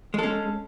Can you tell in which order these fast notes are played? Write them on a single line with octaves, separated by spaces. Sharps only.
G#3 A4 C#4